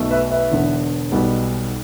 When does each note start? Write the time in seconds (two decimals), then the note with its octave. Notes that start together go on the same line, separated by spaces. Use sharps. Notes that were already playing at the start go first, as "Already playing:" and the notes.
Already playing: B1 B2 A3
0.11 B4 E5
0.31 B4 E5
0.51 E1 E2 D3 B3
1.12 B1 B2 G3 B3